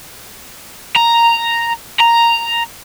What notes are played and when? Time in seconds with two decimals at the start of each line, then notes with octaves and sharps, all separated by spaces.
0.96 A#5
2.00 A#5